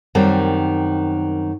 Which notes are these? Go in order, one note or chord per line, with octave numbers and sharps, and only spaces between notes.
F#2 D#3 G3 C4